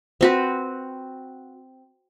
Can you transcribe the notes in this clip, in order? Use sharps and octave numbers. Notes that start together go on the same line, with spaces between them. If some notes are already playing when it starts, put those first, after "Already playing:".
C4 F#4 B4